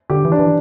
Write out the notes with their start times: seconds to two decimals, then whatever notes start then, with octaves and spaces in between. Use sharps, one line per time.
0.10 D3 G4
0.25 E3
0.32 D4
0.39 E3